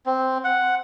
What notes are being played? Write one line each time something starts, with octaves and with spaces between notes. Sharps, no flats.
C4
F#5